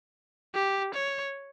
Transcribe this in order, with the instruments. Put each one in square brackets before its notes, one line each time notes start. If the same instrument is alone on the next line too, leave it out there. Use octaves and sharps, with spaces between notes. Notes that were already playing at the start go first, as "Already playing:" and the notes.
[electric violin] G4
C#5